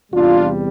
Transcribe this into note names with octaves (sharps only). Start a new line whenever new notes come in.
E2 C3 G3 D4 F4